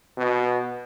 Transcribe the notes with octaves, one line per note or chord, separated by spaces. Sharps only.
B2